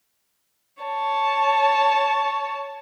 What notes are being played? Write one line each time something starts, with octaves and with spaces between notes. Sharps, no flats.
C#5 A5